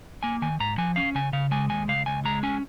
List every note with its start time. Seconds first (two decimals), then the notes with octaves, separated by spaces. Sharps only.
0.23 A#3 G#5
0.42 D#3 G#5
0.60 G#2 A#5
0.78 F3 G#5
0.96 C#4 F5
1.15 C#3 G#5
1.33 C#3 F5
1.51 G#3 G#5
1.70 D#2 G#5
1.88 C#2 F5
2.06 C#2 G#5
2.25 G#3 A#5
2.43 C#4 G#5